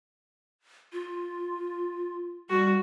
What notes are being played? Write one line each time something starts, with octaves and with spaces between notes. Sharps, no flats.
F4
G3 F#4